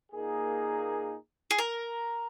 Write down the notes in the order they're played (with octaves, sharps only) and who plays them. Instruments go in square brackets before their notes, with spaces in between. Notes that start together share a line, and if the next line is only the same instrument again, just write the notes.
[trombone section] A#2 A#3 D#4 G#4
[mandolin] G#4
A#4